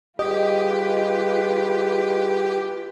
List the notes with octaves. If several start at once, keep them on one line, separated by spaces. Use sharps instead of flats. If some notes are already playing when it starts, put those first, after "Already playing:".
G3 F4 G4 G#4 B4 D#5